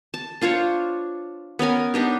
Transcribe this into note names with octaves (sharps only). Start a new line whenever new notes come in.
A5
D4 F4 C5 C#5
B3 C#4 A#4 G#5
B3 D4 D#4 G4